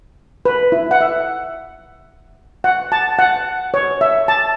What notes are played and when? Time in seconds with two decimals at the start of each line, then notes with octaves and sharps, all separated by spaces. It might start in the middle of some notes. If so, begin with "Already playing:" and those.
0.45 B4
0.72 E4
0.91 F#5
1.01 E5
2.64 F#5
2.92 A5
3.19 F#5
3.74 C#5
4.01 E5
4.28 A5